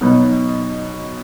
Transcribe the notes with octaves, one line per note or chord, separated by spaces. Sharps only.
B2 F#3 B3 D#4